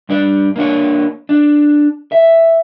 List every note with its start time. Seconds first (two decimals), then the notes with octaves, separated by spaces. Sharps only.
0.09 G2 D4 D5
0.56 A#3 D4 C#5
1.29 D4
2.12 E5